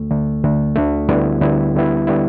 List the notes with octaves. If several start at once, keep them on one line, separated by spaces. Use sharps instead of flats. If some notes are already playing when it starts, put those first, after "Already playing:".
Already playing: D2 D3 A3
D2 D3 A3
D2 D3 A3
D2 D3 A3
D2 D3 G3 B3 E4
D2 D3 G3 B3 E4
D2 D3 G3 B3 E4
D3 G3 B3 E4